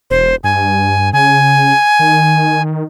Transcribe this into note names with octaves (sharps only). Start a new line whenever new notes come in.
E1 C5
G2 G#5
C#3 G#5
D#3